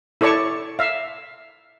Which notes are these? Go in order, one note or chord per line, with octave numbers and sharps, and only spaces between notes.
E4 A4 C#5 D5 A5 C#6
E5 F5